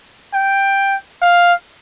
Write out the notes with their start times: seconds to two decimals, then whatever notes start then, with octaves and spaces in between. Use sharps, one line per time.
0.34 G5
1.22 F5